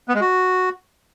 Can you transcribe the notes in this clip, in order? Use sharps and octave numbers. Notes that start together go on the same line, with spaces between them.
B3
G#3
F#4